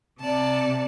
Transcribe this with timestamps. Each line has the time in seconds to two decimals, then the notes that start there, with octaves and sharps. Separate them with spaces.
0.20 C3 D5 A5